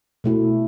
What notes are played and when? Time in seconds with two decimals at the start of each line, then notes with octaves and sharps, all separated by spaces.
0.24 B2 A3 E4